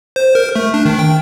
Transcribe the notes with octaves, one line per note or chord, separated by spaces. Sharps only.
C5
A#4
A3
D4
D#3
G5